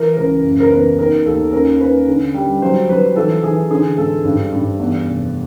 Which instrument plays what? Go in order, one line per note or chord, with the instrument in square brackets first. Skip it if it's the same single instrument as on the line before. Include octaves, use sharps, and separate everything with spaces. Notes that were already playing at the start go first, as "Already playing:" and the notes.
Already playing: [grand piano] E3 A#4
C#2 A#4
F#1
A#4
E2 B4
D#3 A#4
D#2 A4
C#4 A#4
C#4 B4
D3
G3
F#3 C5
F#3 B4
E3 A4
E3 G#4
D3 G#4
G#1 A4
G2
G2
E2
F1